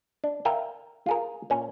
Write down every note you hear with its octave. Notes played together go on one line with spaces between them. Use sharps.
D4
A#4 E5 F5 G5
F4 G#4 A#4
A#2 C#4